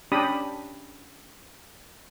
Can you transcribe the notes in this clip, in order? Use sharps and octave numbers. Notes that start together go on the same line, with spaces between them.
C#4 D4 G4 B5 D#6